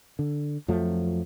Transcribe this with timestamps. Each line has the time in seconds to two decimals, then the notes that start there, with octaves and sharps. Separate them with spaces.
0.19 D3
0.68 F2 F3 F#3 A3